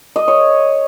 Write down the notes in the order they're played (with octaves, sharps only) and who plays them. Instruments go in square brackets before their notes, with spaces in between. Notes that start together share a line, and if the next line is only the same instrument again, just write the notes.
[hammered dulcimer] D#5
C#5